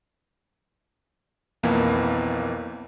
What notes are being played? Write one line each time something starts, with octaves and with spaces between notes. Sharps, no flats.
B1 F2 E3 A#3 B3